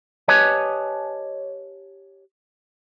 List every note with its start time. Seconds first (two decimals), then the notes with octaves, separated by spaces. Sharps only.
0.28 G4 B4 C#5 D#5 G#5 A5